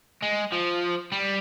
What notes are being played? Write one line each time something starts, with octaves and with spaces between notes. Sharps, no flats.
G#3
F3
G3